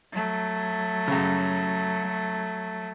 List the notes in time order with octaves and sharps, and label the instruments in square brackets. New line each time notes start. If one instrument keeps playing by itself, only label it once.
[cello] F#3 A3
[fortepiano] F#2 C#3